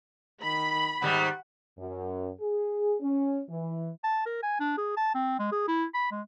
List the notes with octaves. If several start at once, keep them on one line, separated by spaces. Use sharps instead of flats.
D#3 B5
G#2 D#3 G3 F#5
F#2
G#4
C#4
E3
A5
A#4
G#5
D4
G#4
A5
C4
G#3
G#4
E4
B5
G#3